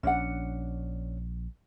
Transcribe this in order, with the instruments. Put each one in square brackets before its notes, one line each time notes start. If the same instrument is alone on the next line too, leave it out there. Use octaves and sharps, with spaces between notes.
[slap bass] A#1 [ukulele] C#4 D4 F#5